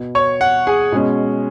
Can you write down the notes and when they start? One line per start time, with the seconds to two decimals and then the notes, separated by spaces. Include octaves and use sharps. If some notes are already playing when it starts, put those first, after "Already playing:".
Already playing: B2 B3
0.15 C#5 C#6
0.41 F#5
0.67 G#4 G#5
0.92 B2 G#3 C#4